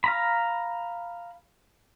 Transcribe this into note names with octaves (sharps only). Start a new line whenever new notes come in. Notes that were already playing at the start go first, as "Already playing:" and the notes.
F5 A#5 B5